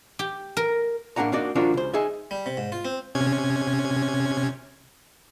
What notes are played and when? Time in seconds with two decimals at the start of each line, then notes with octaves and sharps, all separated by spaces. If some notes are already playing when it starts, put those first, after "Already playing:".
0.19 G4
0.57 A#4
1.16 A2 A#3 D4 G4 F#5 A#5
1.32 A#3 D4 D#4 F#4 D5
1.55 D#2 F3 D4 F4 F#4 A#4
1.74 C#2 C5
1.94 D#4 G#4 E5
2.31 G3
2.46 C3
2.57 G#2
2.72 F4
2.85 C4
3.15 C3 C#4 G#6